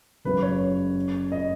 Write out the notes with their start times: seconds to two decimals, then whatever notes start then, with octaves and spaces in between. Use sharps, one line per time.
0.25 F#1 F#2 C#3 B4
0.42 C#5
1.32 D#5